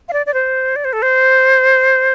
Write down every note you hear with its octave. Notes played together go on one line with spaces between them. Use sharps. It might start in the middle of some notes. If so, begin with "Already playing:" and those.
F5
D5
D5
C5
D5
C5
A4
C5